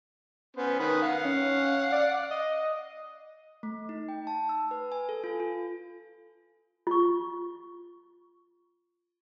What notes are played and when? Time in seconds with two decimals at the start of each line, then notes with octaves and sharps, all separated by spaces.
0.56 B3 C#4 C5
0.80 D#3 B4 D#6
1.02 F5 F#5
1.25 C#4
1.92 D5
2.31 D#5
3.63 A3
3.89 D#4
4.09 G5
4.27 A5
4.49 E6
4.71 B4
4.92 G#5
5.09 A4
5.24 F4
5.40 F4
6.87 F4 C#6